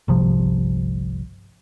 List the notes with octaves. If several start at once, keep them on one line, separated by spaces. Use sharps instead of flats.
G1 C2 C3 F3